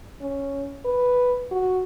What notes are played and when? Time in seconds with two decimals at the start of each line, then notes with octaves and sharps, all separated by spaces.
0.21 C#4
0.85 B4
1.51 F#4